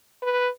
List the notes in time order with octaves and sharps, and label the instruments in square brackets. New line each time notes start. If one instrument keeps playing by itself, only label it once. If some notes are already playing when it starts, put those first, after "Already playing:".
[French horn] B4